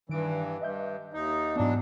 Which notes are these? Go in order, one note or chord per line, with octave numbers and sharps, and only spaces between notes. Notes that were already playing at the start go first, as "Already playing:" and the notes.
G2 D#3 E3 D7
G2 D#5 E5 G6
D#2 D#4
G#2 E3 F#3 B3 D4